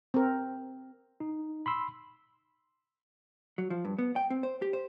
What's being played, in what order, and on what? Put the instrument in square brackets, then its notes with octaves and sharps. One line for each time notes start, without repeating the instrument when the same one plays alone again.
[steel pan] C4 A#4
[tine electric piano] D#4
B5 C6 E6
[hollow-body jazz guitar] F#3
F3
G2
B3
G5
C4
C5
G4
C5